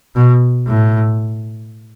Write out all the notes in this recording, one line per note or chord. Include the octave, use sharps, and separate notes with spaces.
B2
A2